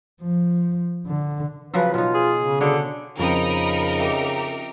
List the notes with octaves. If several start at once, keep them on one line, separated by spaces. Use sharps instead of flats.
F3
D3
C#3 F3 F#3 B4
B2 D#4 F4
G#4
C#3
D3 F#4 C#5
F2 C#3 D#4 A#4 G5 B5 D#6
G4 E5 D6